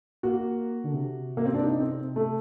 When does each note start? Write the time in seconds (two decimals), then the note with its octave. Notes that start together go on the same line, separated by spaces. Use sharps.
0.23 A#3 F#4
0.84 D3
0.94 C3
1.37 A#3
1.46 C4
1.54 D4
1.64 D#4
1.80 C4
2.16 A3